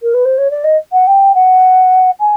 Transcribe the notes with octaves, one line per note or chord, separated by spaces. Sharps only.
A#4
B4
C5
C#5
D5
D#5
F#5
G5
F#5
G#5